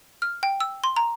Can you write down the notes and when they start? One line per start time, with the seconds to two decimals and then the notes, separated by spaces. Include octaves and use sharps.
0.22 F6
0.43 G5
0.60 E6
0.84 C6
0.96 A#5